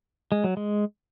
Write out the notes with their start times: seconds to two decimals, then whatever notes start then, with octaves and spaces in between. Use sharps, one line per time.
0.32 G#3
0.44 F#3
0.57 G#3